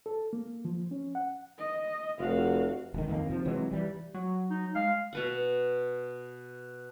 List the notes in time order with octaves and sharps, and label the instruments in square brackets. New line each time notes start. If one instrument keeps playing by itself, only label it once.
[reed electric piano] A4
A#3
F3
C#4
F#5
[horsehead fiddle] D#5
[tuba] F1 [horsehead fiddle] F#4 F5
[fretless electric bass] E1 D#3
F2 D#3 A#3
C3 F3
C3 E3 F#3 G#3
E3 G3
[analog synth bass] F#3
[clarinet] D#4
[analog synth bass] G#3 [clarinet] F5
[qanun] B2 B4 F#5